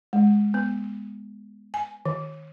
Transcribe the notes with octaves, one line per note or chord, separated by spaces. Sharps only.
G#3
B3
G#5
D#3